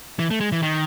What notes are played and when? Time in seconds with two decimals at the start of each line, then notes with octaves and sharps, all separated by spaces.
0.19 E3
0.31 A3
0.41 G#3
0.52 E3
0.62 D#3